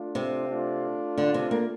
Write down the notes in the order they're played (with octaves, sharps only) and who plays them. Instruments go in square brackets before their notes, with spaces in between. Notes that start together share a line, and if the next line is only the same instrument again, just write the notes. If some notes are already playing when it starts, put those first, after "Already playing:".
Already playing: [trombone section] A3 D4 F4
[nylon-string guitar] C3
[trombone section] A3 D4 F4
[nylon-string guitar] D3
C3
A#3